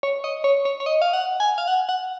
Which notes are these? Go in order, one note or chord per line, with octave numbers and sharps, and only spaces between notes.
C#5
D#5
C#5
C#5
C#5
D#5
F5
F#5
G#5
F5
F#5
F#5